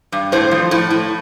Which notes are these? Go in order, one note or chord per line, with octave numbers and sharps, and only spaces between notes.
G2
A2 C5
F3
A2
A2